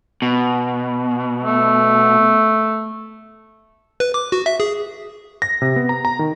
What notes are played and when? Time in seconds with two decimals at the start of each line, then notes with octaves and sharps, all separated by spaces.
0.22 B2
1.44 A3
4.00 B4
4.14 D6
4.32 F#4
4.46 E5
4.60 G#4
5.42 A#6
5.62 C3
5.76 B3
5.89 A#5
6.05 A#5
6.19 D#3